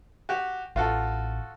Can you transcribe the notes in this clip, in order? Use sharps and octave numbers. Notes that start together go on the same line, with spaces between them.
F#4 G4
A1 F4 F#4 A4